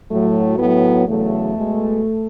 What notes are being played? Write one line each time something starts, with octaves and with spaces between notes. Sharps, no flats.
A2 F#3 A3
A2 B3
F#3
E2 C#3 F#3 A3
B2 G#3